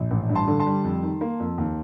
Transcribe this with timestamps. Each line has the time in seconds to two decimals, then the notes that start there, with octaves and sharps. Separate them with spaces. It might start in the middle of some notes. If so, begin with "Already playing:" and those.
Already playing: A#1
0.11 A1
0.29 G2
0.35 A5 C6
0.48 D3
0.59 A5 C6
0.67 G3
0.84 F2
1.03 D#3
1.21 A#3
1.40 F2
1.58 D#2